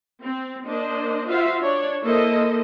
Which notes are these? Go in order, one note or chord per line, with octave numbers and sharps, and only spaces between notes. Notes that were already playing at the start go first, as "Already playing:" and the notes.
C4
A#3 D4 C5 D#5
F4 F#4 C5 E5 F5
D4 C#5 D5
A#3 E4 A4 C5 D#5